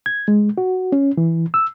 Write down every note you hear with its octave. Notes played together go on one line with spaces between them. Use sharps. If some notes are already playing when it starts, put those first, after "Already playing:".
G#6
G#3
F#4
C#4
E3
E6